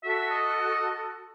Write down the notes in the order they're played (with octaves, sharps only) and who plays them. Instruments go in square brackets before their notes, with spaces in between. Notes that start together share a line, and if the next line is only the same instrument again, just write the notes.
[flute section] F#4 A4 [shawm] E5
[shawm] D#5